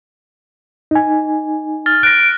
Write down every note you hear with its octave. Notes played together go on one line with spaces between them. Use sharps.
D#4 G#5
F6 A6
F#6 A#6 D7